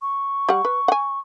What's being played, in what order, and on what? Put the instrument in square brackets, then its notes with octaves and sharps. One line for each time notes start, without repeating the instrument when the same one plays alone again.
[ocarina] C#6
[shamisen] G3 F#5
B4
F#5 G#5